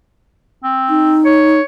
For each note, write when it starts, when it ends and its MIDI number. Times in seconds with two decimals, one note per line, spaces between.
0.63 1.20 60
0.89 1.60 63
1.25 1.65 73